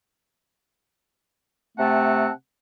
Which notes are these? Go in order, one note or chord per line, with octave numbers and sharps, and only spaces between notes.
C3 A3 C4 F#5 A5